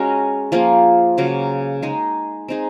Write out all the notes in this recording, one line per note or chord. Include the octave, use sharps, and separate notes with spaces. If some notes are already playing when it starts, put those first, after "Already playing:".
Already playing: G#3 C#4 F#4 A#4
F3 A#3 F4 G#4
C#3 F#3 A#3
G#3 D#4 G#4
C4 D#4 G#4